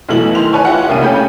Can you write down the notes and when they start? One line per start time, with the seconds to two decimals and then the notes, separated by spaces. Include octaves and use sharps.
0.09 B1 B2 E3 A3 F#7
0.35 D#3 E3 C6 F7
0.53 B4 C#5 G#5 A5 C#6
0.65 E4 F4 G4 E5 F#5
0.89 C2 A#3 C#4 F5 D#7
1.01 C#3 A3 C#4 G4 B5 G6